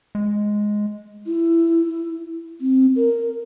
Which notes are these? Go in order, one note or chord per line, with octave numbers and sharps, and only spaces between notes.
G#3
E4
C4
A#4